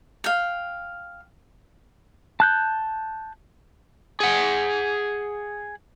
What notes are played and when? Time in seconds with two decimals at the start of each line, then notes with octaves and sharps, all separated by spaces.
0.24 F5 G5
2.40 A5 F#6 G6
4.20 G#4 F#5